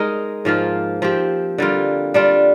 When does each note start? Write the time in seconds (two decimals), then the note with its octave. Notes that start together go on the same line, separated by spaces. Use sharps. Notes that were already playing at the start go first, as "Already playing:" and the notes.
Already playing: G#3 D#4 A#4
0.45 G#2 F3 A#3 F4
1.02 F3 C4 G4
1.58 D3 G3 A#3 F4
2.14 G3 D4 F4